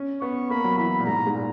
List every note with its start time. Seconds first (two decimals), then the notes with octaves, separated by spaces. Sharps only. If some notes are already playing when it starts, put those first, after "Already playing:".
Already playing: C#4
0.21 B3 C#6
0.50 A#3 B5
0.64 F#3
0.78 E3 B5
0.99 A#2
1.06 G#2 A#5
1.27 G#2
1.34 A#2